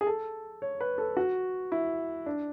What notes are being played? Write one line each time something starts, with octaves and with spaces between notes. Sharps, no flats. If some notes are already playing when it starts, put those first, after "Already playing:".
G#4
A4
C#5
B4
A4
F#4
E4
D4